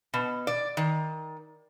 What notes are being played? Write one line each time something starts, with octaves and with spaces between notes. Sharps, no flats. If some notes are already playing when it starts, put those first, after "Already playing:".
B2
D5
D#3